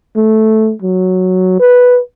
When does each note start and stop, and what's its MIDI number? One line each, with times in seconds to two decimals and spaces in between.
0.16 0.73 57
0.82 1.59 54
1.60 1.99 71